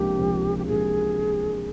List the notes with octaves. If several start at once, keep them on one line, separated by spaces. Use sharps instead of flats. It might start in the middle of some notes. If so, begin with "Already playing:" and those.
Already playing: C#2 C3 F3 A#3 D4 G4
C#2 C3 F3 A#3 D4
G4
C#2 C3 F3 A#3 D4 G#4